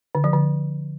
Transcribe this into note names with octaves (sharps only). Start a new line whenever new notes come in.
D3
F3
D3